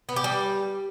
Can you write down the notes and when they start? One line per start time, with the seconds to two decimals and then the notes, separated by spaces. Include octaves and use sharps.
0.09 B3
0.16 G4
0.24 G3